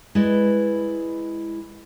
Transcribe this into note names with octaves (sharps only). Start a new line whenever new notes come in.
G#3 E4 B4 D5 D#5